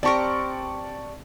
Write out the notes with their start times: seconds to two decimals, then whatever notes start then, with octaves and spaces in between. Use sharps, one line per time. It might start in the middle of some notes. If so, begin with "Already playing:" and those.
0.03 C4 G4 A#4 D5 A5 C#6